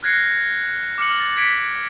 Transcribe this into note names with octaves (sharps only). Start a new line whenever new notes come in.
F6 F#6 G#6 A#6 C7 C#7
D6 F6 C#7 F#7
A6
G#6 B6 C#7 D7